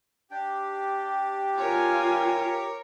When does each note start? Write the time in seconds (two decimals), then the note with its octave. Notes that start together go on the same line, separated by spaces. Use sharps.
0.31 D4 G4 G5
1.58 F4 A#4 C#5 G#5